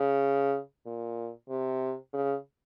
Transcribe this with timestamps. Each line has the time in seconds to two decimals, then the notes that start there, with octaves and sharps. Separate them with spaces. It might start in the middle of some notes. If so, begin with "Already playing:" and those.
Already playing: C#3
0.86 A#2
1.49 C3
2.13 C#3